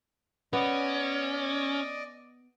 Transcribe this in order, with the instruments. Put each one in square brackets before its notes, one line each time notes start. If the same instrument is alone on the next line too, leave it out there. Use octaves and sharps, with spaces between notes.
[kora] B3 [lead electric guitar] C#4 [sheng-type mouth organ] D5 D#5